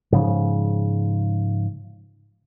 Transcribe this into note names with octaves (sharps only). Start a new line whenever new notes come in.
G#2 C#3 F3